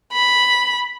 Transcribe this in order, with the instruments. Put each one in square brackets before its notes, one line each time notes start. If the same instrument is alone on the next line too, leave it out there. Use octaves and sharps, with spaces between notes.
[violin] B5